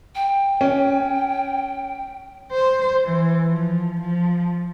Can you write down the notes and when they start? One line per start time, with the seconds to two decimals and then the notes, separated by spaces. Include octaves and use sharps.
0.15 G5
0.61 C#4
2.52 C5
3.06 E3
3.46 F3
4.01 F3